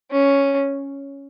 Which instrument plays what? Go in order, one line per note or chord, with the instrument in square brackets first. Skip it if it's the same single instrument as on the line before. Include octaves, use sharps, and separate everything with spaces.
[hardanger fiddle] C#4